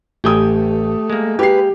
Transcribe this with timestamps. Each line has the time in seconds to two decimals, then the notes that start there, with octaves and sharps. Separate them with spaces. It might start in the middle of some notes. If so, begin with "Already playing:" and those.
0.24 A1 A3 G4 G5 G#5 D#6
1.10 G#3 A#3
1.39 G4 B4 C7